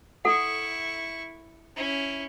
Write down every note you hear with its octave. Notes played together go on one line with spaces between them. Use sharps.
E4 A4 F#5 C#6
C#4 E4